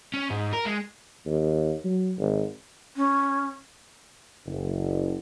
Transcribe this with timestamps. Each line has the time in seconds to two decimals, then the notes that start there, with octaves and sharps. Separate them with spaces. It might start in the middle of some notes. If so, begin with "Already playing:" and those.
0.14 C#4
0.30 G#2
0.53 A#4
0.66 G#3
1.26 D#2
1.85 F#3
2.18 G#1
2.97 C#4
4.46 F#1